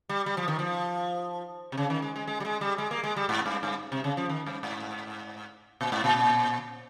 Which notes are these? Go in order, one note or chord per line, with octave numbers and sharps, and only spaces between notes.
G3
G3
F3
D#3
F3
C3
C#3
D#3
G#3
G#3
G#3
G3
G#3
G3
G#3
A#3
G#3
G3
G#2
G2
G2
C3
C#3
F3
D#3
G2
G#2
A#2
G#2
A#2